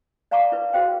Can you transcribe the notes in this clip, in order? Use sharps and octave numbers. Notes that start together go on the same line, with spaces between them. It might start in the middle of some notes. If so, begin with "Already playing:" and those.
D5 F5 A5 A#5 C#6 D6
E4 B4
F#4 G#4 B4 C5 F5 G5